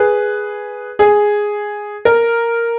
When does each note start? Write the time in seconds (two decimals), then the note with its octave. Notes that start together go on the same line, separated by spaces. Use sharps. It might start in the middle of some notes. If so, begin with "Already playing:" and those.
Already playing: G#4 B4
0.99 G#4
2.05 A#4